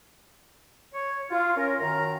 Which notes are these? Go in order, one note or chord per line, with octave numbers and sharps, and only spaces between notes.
C#5
F4
C#4 A#4
F#2 D#3 A#5